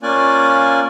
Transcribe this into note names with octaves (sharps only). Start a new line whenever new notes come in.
A#3 C#4 F4 D5 G#5 F#6